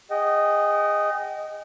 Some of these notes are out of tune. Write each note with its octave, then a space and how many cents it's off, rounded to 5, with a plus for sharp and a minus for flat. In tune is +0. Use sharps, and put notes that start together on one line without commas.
G#4 -30 D#5 +0 G5 -40